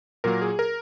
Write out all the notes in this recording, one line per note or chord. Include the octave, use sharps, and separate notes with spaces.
A#2 F#3 A#3 A#4
G#4
A#4